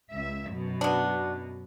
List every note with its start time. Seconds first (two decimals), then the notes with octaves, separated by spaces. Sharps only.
0.11 C#2 E5
0.51 F#2 B2
0.81 B3 D4